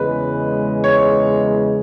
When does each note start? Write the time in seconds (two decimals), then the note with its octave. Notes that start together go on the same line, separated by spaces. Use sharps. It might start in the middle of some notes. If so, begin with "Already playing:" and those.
Already playing: E2 C#3 G#3 B4
0.84 C#5